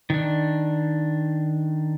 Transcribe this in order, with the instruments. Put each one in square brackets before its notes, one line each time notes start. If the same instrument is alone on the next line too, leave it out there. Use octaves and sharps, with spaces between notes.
[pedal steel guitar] D#3 D4